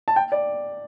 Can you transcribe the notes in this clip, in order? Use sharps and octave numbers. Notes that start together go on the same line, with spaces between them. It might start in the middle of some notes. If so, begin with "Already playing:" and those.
A5
G5
D5